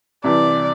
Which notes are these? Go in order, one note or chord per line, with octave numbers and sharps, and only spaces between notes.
C2 C3 E3 D5